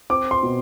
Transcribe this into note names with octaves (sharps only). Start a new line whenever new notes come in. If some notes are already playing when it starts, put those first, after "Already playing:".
C4 D6
C6
B2